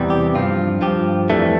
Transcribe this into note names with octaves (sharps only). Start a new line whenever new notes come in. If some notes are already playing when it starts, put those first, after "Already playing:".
Already playing: E2 C3 E3 G3
G4
G2 F3 F4
G2 F3 G4
F2 E3 G3 A3